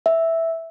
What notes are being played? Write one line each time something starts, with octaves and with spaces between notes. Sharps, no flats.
E5